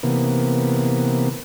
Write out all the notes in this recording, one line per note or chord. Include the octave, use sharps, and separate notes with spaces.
C3 E3 A#3 B3